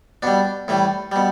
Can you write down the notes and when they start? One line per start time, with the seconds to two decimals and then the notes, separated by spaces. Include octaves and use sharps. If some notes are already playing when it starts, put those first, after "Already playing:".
0.22 B2 G3 D4
0.68 A2 E3 G3
1.12 B2 G3